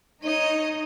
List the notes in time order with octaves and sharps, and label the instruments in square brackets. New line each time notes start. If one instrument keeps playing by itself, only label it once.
[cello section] D#4 [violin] C#5 D#5